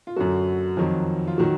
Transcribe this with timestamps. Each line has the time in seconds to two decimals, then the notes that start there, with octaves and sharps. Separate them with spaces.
0.07 F4
0.16 F#2 D3 F#3 F#4
0.77 F2 D#3 F#3
1.28 F4
1.38 D#3 F#3 F#4